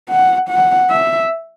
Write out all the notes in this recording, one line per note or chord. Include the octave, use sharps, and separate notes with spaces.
F#5
F#5
E5